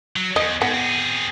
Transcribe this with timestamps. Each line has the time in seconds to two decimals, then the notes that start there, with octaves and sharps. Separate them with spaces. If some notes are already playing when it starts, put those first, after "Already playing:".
0.16 F#3
0.36 E2 D#5
0.62 G#2 B3
0.74 C4 G#4